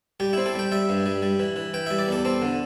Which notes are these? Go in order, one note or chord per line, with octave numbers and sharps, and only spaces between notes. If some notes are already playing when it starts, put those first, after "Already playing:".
G3 G4
C4 E4
A4
G3 G5
G3 E5
G2
G3
G3
E3
E3
E3 G5
G3 E5
D5
E2 A4
C4 A4
D3